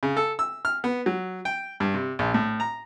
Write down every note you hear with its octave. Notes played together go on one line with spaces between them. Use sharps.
C#3
A4
E6
F6
B3
F#3
G5
G2
C3
A#1
A2
A#5